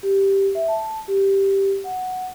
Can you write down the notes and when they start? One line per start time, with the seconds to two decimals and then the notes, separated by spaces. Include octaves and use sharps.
0.03 G4
0.55 E5
0.68 A5
1.08 G4
1.84 F#5